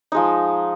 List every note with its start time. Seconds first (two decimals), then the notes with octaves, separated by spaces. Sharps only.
0.12 F3 G#3 D#4